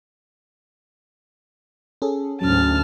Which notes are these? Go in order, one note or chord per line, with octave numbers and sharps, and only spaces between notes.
C#4 G#4 A4
D2 G#2 F#3 C#4 A5 F6